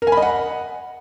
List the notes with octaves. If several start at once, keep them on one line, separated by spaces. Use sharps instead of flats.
A#4
G#5
B5
D#5
F#5